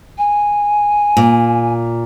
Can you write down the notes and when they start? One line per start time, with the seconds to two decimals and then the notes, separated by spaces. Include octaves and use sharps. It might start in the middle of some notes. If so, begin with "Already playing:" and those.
0.18 G#5
1.17 A#2